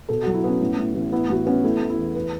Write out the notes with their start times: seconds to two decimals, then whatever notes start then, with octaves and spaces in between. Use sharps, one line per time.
0.09 B2 A4
0.22 F#3 F#4
0.34 E4
0.44 B3 C#4
0.60 A2
0.77 A2
0.94 A1
1.12 B3 E4
1.30 A1 F#4
1.46 B3 C#4
1.64 A3 E4
1.81 A3
1.90 E4
1.99 E2
2.15 B4